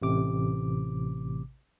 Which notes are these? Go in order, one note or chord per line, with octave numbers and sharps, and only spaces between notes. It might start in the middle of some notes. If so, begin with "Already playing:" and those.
A1 C3 D6